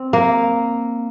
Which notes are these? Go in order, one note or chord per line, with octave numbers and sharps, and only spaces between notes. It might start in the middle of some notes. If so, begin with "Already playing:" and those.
Already playing: C4
A#3